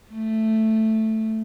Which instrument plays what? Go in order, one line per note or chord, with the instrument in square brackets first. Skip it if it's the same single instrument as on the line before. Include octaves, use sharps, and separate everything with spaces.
[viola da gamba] A3